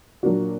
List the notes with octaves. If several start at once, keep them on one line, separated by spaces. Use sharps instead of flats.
A#2 F#3 A#3 D4 F#4